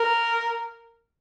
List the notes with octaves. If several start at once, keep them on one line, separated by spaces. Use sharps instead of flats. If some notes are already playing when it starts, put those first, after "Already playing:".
Already playing: A#4